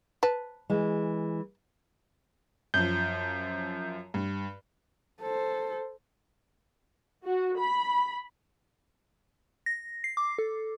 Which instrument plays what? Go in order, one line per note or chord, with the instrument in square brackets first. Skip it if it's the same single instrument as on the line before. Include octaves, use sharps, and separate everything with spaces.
[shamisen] B4 A5
[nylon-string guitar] E3 G#3
[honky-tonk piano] F#2 F3 [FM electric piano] G6
[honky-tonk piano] G2
[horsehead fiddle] A4 C5
[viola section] F#4
B5
[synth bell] A#6
C7
D6
A4